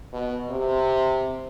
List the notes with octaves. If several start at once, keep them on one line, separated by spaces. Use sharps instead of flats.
B2
C3